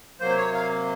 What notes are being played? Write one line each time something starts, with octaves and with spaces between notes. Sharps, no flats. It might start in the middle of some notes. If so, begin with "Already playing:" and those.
C3 F#3 A#3 C5
C#5
F5